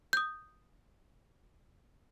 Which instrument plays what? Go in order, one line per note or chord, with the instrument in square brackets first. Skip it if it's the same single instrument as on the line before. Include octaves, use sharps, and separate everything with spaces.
[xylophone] D#6 G6